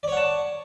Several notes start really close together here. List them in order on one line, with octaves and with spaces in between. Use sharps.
D5 C#5 F#5 A5